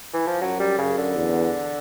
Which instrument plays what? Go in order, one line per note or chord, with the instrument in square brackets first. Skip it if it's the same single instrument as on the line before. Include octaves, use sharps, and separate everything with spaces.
[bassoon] E3
F3
[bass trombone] F#2 [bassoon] F#3
[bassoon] G3
[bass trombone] F#2 [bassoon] C#3
[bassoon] D3
[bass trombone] E2